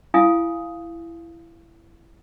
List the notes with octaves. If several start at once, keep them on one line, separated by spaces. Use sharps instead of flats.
E4 F5 G#5 D#6